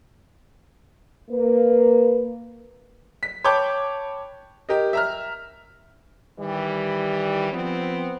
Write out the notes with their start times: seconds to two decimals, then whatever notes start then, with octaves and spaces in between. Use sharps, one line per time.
1.30 A#3 B4
3.23 B6
3.44 C#5 G5 A5 B5 D6 G6
4.69 G4 A#4 D#5
4.93 E5 A#5 F6
6.40 D#3 E3 G3
7.52 F3 B3 C4